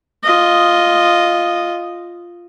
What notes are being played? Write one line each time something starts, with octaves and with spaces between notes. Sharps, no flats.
F4 D#5